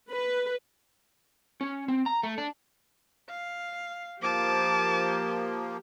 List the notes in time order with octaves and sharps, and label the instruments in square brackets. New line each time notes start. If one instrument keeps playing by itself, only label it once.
[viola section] B4
[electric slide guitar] C#4
C4
A#5
A3
D4
[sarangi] F5
[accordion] F3 A#3 [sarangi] G4 [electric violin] A5 D6